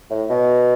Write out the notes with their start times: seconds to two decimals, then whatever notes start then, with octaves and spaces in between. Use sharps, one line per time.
0.10 A2
0.29 B2